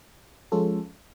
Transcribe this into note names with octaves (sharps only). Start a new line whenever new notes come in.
F3 G#3 C#4 F4 A4